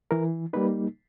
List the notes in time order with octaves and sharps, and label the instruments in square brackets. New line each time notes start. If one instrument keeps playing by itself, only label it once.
[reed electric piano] E3 A#4
G3 A#3 D#4 B4